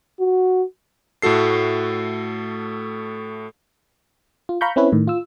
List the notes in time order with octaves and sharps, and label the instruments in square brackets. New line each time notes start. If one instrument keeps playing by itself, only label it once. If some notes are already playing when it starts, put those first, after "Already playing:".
[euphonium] F#4
[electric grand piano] A2 A3 F#4 A4 C7
[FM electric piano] F4
F5 A#5 B5 C#6 G6
C4 C#4 E4 B4 C#5
A2 D#3
F4 E6